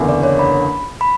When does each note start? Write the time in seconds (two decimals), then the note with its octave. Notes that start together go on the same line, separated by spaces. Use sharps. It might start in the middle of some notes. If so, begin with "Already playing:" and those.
Already playing: F#1 E2 D3
0.09 D5
0.23 C#5
0.39 B5
1.01 B5